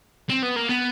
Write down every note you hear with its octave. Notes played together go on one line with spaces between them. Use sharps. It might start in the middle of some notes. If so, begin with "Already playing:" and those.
C4
B3
A#3
B3